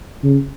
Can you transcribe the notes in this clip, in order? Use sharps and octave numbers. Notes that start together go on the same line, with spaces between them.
C#3